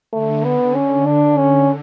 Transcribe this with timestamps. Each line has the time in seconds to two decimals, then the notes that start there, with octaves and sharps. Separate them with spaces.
0.13 D3 A3
0.44 B3
0.75 C#4
1.06 D4
1.38 C#4